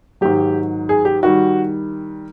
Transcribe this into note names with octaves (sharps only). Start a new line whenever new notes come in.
G#2 D#3 F#3 G4
G#4
G4
D#3 G3 F#4